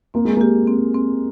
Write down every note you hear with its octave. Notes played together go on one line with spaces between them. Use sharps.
A#3 C4
G#3
A#3 G4
C4
C4